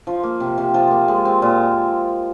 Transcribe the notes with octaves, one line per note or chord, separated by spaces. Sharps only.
F3
A#3
C3
C3
F3
A#3
G#3
C4
A#2